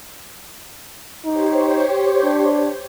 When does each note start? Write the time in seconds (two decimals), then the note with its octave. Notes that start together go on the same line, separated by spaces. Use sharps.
1.25 D#4 G4 C5 C#5
2.24 D4